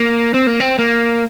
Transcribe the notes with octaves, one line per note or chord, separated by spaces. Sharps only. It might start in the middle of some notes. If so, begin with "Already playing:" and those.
Already playing: A#3
C4
A#3
C4
A#3